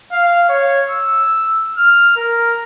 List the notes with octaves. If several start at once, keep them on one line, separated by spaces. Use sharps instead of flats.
F5
C#5
E6
F6
A#4